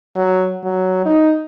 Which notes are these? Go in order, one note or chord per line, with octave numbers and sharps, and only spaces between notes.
F#3
F#3
D#4